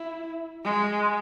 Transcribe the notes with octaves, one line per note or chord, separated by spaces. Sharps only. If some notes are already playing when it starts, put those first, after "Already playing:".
Already playing: E4
G#3